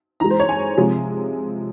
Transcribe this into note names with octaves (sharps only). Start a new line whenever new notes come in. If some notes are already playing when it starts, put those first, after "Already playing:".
E3 G#3 A#5
C5
C#5
G#5
C3 F3 G#3